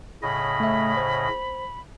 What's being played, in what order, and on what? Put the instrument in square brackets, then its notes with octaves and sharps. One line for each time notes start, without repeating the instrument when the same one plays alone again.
[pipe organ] A2 C#3 D#5 [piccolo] B5
[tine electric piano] A3 E5
C5